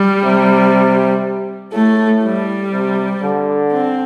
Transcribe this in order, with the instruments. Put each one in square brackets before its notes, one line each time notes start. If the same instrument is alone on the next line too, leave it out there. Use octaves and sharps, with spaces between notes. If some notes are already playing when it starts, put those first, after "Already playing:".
Already playing: [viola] G3
[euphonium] C3
[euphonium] A2 [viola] A3
[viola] G3
[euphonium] C3
D3
[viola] C4